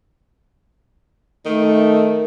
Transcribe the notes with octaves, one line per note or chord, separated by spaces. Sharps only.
D#3 A3